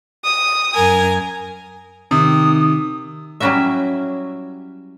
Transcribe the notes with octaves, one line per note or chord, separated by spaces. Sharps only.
D#6
F#2 A#4 G#5
C3 D#3 D#6
F#3 G3 C#4 E4 F#4 E5